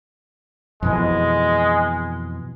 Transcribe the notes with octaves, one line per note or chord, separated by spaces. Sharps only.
F2 B2 E3 G#3